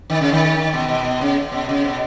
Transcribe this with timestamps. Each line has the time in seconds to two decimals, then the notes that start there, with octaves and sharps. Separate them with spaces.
0.10 D#3
0.21 C#3
0.32 D#3
0.73 B2
0.88 B2
1.05 B2
1.21 C#3
1.52 B2
1.69 C#3
1.84 B2